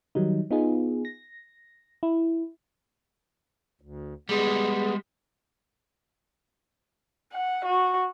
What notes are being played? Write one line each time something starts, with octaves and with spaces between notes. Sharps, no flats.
D#3 F#3 G3 D#4
B3 D#4 F4 G#4
A#6
E4
D2
G3 G#3 B3 G#4
F#5
F#4